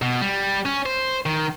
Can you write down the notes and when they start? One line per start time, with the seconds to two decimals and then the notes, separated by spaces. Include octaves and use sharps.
0.02 B2
0.21 G3
0.66 C#4
0.86 C5
1.26 D#3